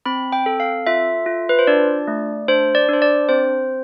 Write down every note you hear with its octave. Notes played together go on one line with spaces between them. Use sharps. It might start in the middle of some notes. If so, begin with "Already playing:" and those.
C4 B5
G5
A4
F5
F4 E5
F4
B4
C5
D4 D5
A3
D4 C5
D5
D4 C5
D5
C4 C5